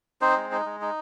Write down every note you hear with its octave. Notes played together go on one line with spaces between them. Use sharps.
C4 D#4 C5
G#3
D#4
G#3
D#4